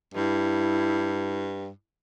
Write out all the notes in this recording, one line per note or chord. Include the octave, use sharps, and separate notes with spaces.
G2 E4